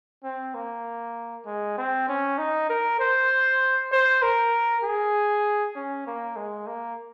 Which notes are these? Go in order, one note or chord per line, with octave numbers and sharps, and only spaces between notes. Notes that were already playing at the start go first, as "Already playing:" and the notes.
C4
A#3
G#3
C4
C#4
D#4
A#4
C5
C5
A#4
G#4
C#4
A#3
G#3
A#3